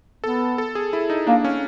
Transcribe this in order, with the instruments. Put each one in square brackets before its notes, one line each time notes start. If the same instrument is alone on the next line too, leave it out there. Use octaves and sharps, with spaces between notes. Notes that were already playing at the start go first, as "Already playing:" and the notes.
[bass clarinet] B3 [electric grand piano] A4
[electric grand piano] A4
G#4
E4
D#4
[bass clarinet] A#3 [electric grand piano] D4
[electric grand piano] C#4